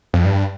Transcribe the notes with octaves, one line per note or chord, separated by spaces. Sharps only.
F2
G2